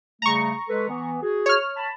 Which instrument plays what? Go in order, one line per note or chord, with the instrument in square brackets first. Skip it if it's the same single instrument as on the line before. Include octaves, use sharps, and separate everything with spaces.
[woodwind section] C#3 G3 A3 [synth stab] A#5 C#6
[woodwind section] G#3 A4 B4
E3 B3
F#4 G#4
[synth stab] C#5 F6
[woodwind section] A5 B5